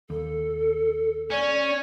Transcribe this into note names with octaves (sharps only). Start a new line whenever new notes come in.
D#2 A4
C#4 D5